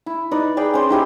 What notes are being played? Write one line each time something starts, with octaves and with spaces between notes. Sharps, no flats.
E4
D#4 B4 D5
G#4 B4 D5 G5
C#4 C5
D#4 E4 G4 C5